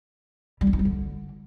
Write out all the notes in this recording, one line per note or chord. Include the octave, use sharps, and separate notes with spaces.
G3
C#4
D#4
G3
D3